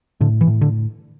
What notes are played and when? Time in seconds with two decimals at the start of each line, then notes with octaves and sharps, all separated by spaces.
0.21 A2 D3
0.41 E3
0.47 A2
0.61 D3